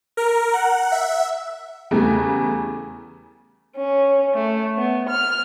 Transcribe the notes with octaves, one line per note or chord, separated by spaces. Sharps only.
A#4
F#5
E5
E2 C#3 G3 A3 B3
C#4
A3
B3
F6